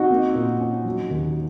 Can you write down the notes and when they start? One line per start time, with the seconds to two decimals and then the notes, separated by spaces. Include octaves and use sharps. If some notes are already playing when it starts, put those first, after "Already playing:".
Already playing: C4 D#4 F#4
0.10 A#3
0.35 A#2
0.60 C#4
0.85 F#3
1.10 D#2